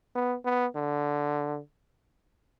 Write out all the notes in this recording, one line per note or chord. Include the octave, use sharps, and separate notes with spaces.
B3
B3
D3